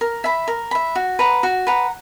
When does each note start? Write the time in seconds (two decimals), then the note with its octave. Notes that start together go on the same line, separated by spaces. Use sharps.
0.01 A#4
0.24 E5 B5
0.48 A#4
0.71 E5 B5
0.95 F#4
1.19 B4 F#5 A#5
1.43 F#4
1.67 B4 F#5 A#5